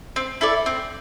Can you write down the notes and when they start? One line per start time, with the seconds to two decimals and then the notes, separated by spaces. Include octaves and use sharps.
0.16 C4
0.41 E4 A4 D5
0.66 C4